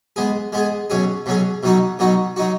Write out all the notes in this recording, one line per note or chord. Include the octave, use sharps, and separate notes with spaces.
G#3 B3 G#4
G#3 B3 G#4
B2 F#3 C#4 G#4
B2 F#3 C#4 G#4
B2 F#3 D#4 F#4
B2 F#3 D#4 F#4
F#3 D#4 F#4